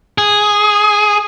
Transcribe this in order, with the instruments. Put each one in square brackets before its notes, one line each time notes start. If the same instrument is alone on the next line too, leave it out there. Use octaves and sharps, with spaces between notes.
[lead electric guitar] G#4